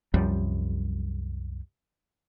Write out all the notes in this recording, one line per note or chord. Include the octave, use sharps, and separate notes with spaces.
C2 F#2 F3 G3